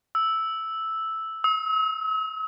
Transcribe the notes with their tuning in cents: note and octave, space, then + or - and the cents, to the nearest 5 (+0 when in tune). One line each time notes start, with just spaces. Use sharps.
E6 -5
E6 -45